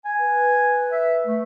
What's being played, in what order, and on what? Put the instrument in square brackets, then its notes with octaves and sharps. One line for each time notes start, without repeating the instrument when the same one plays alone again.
[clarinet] G#5
[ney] B4
[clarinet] E5
A3